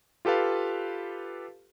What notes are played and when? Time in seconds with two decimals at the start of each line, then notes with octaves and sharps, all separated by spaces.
0.25 F4 G4 A4 B4 F5